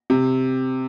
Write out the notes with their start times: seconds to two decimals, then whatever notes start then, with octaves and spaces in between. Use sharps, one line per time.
0.10 C3